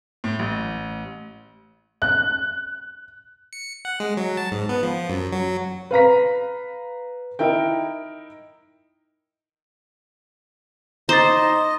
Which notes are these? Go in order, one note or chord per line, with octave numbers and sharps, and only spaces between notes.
A2
A1
F#6
C#7
F#5
G#3
F#3
A5
G#2
B3
F3
F#2
F#3
B4 F5 A#5 B6
D#4 E4 A#4 G5
D#4 C5 D#5 A#5 D6 A6